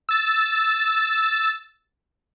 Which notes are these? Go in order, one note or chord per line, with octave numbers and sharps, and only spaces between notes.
E6 A6